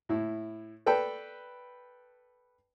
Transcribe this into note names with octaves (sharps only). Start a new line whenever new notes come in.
A2 E4
A4 B4 D5 G5